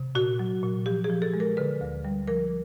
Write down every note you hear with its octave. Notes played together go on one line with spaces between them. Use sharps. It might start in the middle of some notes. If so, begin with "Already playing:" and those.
Already playing: C3
A#2 F#4
F#3
A#2
F3 G4
G#4
F3
A4
G#3
A#4
D3 B4
D2
G3
F3 A#4